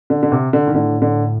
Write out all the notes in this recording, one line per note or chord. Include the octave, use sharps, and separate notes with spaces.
D3
D3
C3
D3
D#3
A2 D3
D3